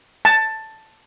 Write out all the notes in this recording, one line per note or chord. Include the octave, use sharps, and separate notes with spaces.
A5